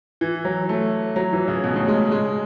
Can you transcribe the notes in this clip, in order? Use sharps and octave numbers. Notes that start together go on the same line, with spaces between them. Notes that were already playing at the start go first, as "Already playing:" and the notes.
E3
F#3
A3
F#3
E3
C#3
B2
A2
G#3
G#3